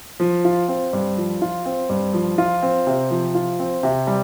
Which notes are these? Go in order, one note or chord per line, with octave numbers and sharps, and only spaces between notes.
F3
F4
C4
G2
F3
F4
C4
G2
F3
F4
C4
C3
F3
F4
C4
C3
G3